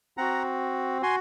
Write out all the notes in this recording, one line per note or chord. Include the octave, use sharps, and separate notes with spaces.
C4 F#4 F#5 A#5
F#4 G#5 C6